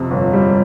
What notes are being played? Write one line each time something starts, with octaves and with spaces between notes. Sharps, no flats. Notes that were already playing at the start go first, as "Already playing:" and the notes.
Already playing: F2 C3
G1
G3